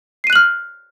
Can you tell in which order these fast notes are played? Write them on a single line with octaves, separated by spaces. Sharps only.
C7 D#7 F#6 F#7 F6